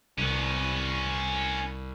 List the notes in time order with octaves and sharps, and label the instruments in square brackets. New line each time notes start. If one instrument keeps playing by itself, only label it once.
[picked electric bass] C2 [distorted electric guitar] C#4 B4